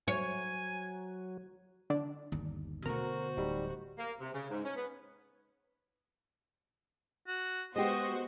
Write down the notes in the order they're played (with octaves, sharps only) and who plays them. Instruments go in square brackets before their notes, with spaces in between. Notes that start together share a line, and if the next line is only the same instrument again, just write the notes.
[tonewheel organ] F#3 [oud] C#5 [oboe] G#5
[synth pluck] D3 D4
[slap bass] G1 D#2
[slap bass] B2 D3 A3 [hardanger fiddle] F#4 C5 [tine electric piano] A#4 [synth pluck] A#5
[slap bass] D1 [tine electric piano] G3 D#4
[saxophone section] A#3
C3
C#3
G#2
C#4
B3
[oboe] F#4
[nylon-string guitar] G#3 G4 [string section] B3 F#4 C5 [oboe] D#5